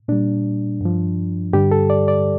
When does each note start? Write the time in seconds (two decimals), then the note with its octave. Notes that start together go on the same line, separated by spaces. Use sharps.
0.08 A#2 G3 D4
0.81 G2 F3
1.53 G2 D3 G3 G4
1.71 A4
1.90 D5
2.08 D5